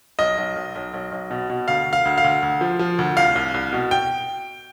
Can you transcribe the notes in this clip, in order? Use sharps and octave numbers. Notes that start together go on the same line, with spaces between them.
B1 D#5
B1
B1
B1
B1
B1
B2
B2
D2 F5
D2
F5
D2
F5
D2
D2
F3
F3
D2
C2 F5
C2
C2
B2
G5